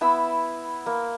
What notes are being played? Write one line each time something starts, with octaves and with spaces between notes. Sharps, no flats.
B3 E4 B5 E6
A#3